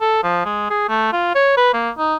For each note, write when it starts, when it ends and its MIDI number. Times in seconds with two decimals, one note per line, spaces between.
0.01 0.20 69
0.23 0.45 53
0.45 0.67 56
0.70 0.85 68
0.89 1.12 57
1.13 1.30 65
1.35 1.53 73
1.57 1.73 71
1.73 1.90 58
1.98 2.16 63